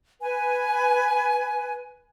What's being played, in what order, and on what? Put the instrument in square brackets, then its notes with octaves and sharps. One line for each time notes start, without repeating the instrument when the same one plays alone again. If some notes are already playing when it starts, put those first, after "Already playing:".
[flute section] B4 G#5